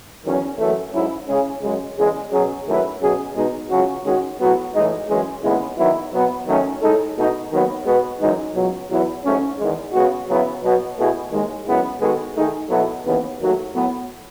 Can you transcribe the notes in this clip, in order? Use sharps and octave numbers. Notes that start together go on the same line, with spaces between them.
E2 D#3 F#3 C#4
F#2 E3 A3
G#2 F#3 C#4 E4
C#3 G#3 C#4 G#4
F#2 C#3 G#3
E2 C#3 G#3
B2 F#3 C#4 G#4
F#2 D#3 A3 E4 B4
B2 F#3 C#4 G#4
B2 G#3 B3 D#4
C#2 C#3 F#3 C#4 F#4
D#3 G#3 C#4 F#4
A2 F#3 B3 F#4
A2 E3 G#3 D#4
F#2 E3 G#3 C#4 G#4
D#2 C#3 G#3 B3 E4
D#3 F#3 B3 E4
B2 F#3 B3
D#3 F#3 A3 C#4
A2 G#3 D#4 A4
B2 A3 D#4
D#2 D#3 F#3 B3
B2 G#3 B3 F#4 B4
F#2 E3 G#3 D#4
C#2 B2 F#3
E2 B2 F#3 B3 E4
G#2 F#3 A3 C#4
E2 D#3 G#3
C#3 G#3 B3 F#4
C#3 F#3 B3 E4
B2 F#3 B3
B2 A3 E4 G#4
D#2 D#3 G#3
F#2 C#3 G#3 B3 E4
D#3 G#3 B3 F#4 A4
D#3 A3 D#4 G#4
B2 F#3 B3 E4 A4
D#2 C#3 E3 B3
D#2 D#3 F#3 A3
A2 F#3 B3